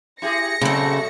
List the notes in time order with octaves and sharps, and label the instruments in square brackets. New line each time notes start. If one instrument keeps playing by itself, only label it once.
[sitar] E4 G4 G#4 [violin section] A#6 C#7
[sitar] A#2 F#3 A3 [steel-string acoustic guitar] C#3 C4